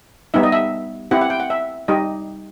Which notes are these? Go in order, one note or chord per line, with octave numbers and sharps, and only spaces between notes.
G3 B3 D#4 E5
D#5
E5
C4 E4 G4 F#5
F#5
G5
F#5
E5
G3 D#4 G4 D#5